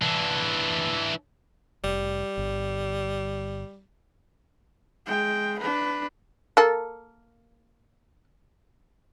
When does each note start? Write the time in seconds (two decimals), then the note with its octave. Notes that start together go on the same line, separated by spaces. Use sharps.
0.02 E3 D4
1.84 F1 G3
2.37 G1
5.07 G#3 G5
5.59 D4 B4
6.57 A#3 A4